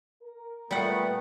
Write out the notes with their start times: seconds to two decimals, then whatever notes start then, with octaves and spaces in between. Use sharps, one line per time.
0.23 A#4
0.71 A#2 G3 A3 B3 F#5